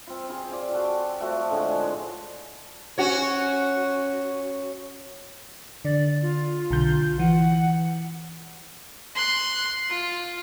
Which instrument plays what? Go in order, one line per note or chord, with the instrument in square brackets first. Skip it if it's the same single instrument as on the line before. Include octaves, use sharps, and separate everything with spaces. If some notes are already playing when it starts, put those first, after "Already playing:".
[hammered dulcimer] C4 F4
F4 G#4 C5
F4 D5
F#4 A4 G5
F3 A3 F#4
A2 D3 G#3
[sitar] C#4 F#4 C#5
[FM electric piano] D3 [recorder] D5
[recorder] F4
[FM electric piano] B1 D3 G6
[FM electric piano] E3 [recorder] F#5
[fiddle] C6 F#6
F4